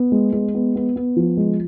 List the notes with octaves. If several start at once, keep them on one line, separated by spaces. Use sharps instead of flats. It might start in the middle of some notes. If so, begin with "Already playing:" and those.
Already playing: B3
G#3
G#3
B3
B3
B3
F3
G#3